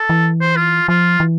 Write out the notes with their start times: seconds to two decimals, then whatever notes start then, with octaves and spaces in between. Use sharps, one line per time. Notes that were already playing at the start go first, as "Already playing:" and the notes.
Already playing: A4
0.09 E3
0.41 C5
0.56 F4
0.88 F3 F4
1.20 E3